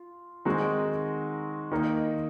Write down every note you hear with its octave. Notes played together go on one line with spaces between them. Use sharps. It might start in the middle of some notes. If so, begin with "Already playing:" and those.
Already playing: F4
D#3 G#3 C4 D#4 F#4
D#3 A#3 D#4